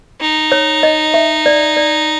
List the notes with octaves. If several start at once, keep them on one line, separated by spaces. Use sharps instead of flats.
D#4
C#5
D#5
E5
D5
D5